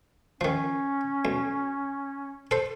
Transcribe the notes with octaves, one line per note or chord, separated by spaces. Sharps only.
D#3 F3 C#4
B1
A4 C5